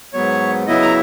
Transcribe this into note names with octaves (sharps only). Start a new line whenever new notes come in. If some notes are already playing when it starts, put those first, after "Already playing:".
G#2 F#3 B3 C#5
C#3 F#3 B3 E4 D#5
A#5